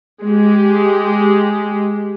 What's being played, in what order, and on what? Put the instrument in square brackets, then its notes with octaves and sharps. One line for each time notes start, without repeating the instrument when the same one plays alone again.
[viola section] G#3 G4